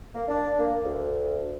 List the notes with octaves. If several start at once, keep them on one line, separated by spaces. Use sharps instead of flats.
A#3
D4
A#3
D2